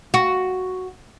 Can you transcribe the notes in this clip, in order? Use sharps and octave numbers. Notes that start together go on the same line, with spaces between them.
F#4